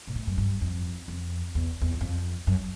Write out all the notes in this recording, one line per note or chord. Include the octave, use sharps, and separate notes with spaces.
A#2
A2
F#2
G2
F2
F2
E2
E2
F2
F#2